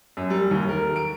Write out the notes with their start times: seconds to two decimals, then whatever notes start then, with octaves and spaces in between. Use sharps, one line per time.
0.17 F#2
0.30 G3
0.51 D#2
0.69 A#4
0.96 D7